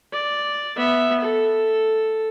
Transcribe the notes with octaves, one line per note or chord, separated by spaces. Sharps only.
D5
B3 E5
A4